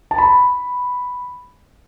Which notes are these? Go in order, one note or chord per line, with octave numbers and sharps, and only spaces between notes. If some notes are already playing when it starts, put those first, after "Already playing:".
A5
B5